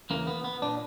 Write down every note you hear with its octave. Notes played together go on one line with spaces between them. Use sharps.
E2 C#3 E3 A#3
B3
B3
A#2 D4